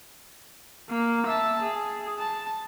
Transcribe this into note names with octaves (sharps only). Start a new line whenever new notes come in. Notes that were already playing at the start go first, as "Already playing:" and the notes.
A#3
E5 A5
G#4
A5